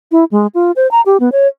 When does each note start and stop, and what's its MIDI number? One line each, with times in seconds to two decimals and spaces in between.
0.12 0.24 64
0.31 0.47 56
0.55 0.71 65
0.76 0.89 72
0.91 1.01 82
1.06 1.17 67
1.20 1.29 59
1.32 1.47 73